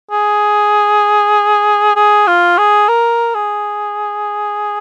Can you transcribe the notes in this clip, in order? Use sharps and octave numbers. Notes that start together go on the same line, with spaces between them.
G#4
G#4
F4
G#4
A#4
G#4